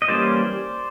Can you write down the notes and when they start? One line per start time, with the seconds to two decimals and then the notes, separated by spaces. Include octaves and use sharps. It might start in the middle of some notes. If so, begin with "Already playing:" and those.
0.02 D#5
0.08 E3 G3 A#3 C#4 C5 D5